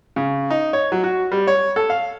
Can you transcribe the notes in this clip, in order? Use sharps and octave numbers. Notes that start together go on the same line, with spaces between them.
C#3
D#4
C#5
F#3
F#4
G3
C#5
A4
F5